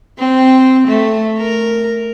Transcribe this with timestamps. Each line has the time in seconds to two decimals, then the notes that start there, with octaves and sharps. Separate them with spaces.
0.18 C4
0.87 A3
1.38 A#4